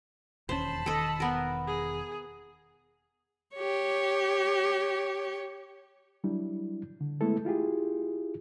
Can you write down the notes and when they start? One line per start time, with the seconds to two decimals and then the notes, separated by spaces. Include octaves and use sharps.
0.49 E1 D#2 C#4 C5 A5 B5
0.86 E1 D#3 A4 D#5
1.20 B3 A#4
1.67 G#4
3.56 G4 C#5
6.24 F#3 G3 D4 E4
7.01 D3
7.21 G#3 A3 B3 E4 A4
7.45 E4 F4 G4 G#4